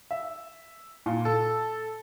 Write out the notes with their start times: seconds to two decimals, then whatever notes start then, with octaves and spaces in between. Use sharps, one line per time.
0.11 E5
1.06 A#2
1.25 A4